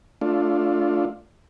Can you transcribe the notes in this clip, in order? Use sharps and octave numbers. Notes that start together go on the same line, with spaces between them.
A3 D4 F4